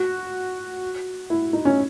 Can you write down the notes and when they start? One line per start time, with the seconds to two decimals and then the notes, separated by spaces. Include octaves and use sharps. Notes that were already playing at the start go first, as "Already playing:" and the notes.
Already playing: F#4
1.30 E4
1.53 D#4
1.65 C#4